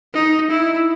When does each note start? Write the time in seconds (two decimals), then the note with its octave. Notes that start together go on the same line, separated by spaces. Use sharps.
0.14 D#4
0.51 E4